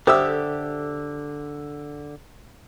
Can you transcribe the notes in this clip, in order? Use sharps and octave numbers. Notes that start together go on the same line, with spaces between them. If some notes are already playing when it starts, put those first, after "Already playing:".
D3 G4 A4 C5 E5 E6